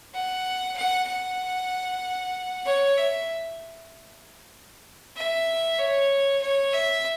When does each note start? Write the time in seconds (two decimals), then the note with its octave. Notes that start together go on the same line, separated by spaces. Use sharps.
0.14 F#5
0.77 F#5
1.08 F#5
2.66 C#5
2.97 E5
5.17 E5
5.79 C#5
6.42 C#5
6.73 E5